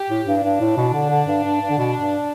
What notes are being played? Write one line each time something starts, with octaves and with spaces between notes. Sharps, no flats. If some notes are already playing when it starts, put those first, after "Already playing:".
Already playing: G4
A2
G2
G2 D4
A2
B2
D3
D3
G2
G2
G2
D3
B2
G2